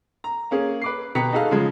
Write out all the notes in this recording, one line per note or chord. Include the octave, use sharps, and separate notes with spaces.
A#5
A#3 C#4 G#4
B4 D6 C7
B2 G4 B4 A#5 B6 C#7
D#4 F#4 G#4 A4 F5
C#3 F3 G#3